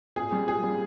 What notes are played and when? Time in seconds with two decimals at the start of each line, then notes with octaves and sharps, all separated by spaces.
0.16 A#2 G#4
0.32 G3
0.47 A#2 G#4
0.63 G3